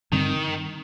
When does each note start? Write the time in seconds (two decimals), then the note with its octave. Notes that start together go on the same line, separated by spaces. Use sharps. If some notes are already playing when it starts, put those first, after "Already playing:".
0.12 G2 D3 D#3 G3 C4